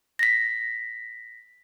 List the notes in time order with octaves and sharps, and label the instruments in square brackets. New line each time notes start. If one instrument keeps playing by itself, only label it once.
[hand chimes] A#6 B6